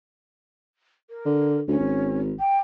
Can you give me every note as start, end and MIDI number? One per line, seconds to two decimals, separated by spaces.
1.10 1.60 70
1.26 1.62 50
1.68 1.77 38
1.68 2.19 61
1.79 2.33 32
2.39 2.57 79